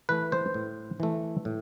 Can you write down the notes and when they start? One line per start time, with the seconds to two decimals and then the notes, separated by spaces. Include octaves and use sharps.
0.09 E3 A3 B4
0.32 C5
0.54 A2
1.00 E3 A3
1.45 A2